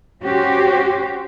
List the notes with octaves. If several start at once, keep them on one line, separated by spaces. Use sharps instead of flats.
C#4 F#4 G4 C5